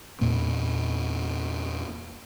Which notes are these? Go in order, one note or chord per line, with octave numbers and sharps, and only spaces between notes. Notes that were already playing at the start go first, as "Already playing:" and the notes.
E2 A#2 A#3